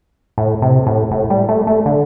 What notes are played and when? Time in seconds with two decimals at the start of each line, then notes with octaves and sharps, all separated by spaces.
0.38 A2
0.62 C3
0.87 A2
1.11 A2
1.30 G3
1.49 A3
1.67 A3
1.86 D3